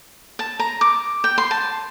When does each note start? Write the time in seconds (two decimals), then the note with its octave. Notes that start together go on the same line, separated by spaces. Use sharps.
0.39 A5
0.59 A#5
0.81 D6
1.24 G5
1.38 C6
1.51 A5